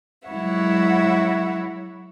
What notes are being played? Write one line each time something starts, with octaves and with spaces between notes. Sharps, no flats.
F#3 G#3 E4 C#5 E5 F#5